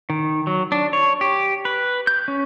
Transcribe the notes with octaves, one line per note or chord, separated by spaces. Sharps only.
D#3
F#3
D4
C#5
G4
B4
G6
C#4